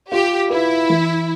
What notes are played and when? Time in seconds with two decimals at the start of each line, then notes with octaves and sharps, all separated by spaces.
0.12 F4 G4
0.50 E4 B4
0.90 E3